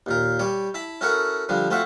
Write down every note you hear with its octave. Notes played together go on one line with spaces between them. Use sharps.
D#2 A#2 A#4
G3 C#5 D5
E4 A5 B5
C#4 E4 F#4 A4 A#4 F#5
D3 F3 G3 D4
A3 C4 F4 F#4 E5 F#5